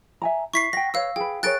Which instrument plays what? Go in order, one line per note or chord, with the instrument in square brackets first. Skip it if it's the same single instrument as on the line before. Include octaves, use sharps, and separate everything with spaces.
[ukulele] E5 G#5 A#5
[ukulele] E4 [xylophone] C#6 B6 C7
[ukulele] F#5 G5 [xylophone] A#6
[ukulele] B4 C#5 [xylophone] F5 E6
[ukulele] G#4 B4 [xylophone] G5
[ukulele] G#4 A#4 C#5 [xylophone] F#6 A6 D7